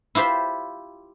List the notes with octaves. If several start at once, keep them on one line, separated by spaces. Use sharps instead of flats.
E4 F4 G4 C5 E5